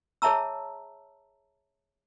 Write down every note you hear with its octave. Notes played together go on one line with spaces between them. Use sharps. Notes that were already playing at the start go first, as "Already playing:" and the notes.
G#4 C#5 E5 A5 A#5 E6